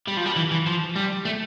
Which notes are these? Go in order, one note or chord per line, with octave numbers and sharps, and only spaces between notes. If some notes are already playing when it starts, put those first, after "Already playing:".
G3
F3
G3
E3
E3
F3
G3
A3